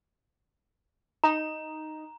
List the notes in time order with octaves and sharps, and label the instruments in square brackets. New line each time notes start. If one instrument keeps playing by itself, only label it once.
[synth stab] D#4 [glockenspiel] A#5